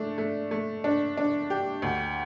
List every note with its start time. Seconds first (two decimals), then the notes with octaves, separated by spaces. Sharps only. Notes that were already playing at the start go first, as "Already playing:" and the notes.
Already playing: A3 D4
0.18 A3
0.51 A3
0.84 D4
1.17 D4
1.50 G4
1.82 D2